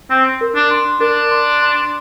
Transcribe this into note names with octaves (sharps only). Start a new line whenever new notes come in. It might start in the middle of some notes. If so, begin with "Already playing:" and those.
C4 C6
A#4
D4
C6
D4 A#4
C6
C6